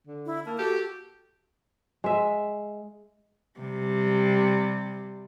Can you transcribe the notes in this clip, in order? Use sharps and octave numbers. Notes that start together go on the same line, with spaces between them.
D3
E4
A#3 A5
F#4 G4 A4
G#3 E5
C3 G3